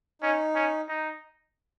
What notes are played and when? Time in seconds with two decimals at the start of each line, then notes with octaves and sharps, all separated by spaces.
0.22 C#4 D#4
0.55 C#4
0.89 D#4